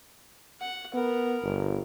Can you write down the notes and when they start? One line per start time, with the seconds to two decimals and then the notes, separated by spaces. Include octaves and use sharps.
0.60 F#5
0.94 B3 A#4
1.43 G1